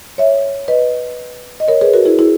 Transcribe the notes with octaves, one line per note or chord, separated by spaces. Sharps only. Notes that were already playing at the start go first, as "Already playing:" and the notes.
C#5 E5
B4 D#5
D#5
A#4 C#5
G#4 B4
F#4 A#4
E4 G#4
E4 G#4